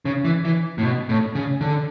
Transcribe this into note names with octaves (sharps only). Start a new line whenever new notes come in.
C#3
E3
E3
A2
B2
A2
C#3
D3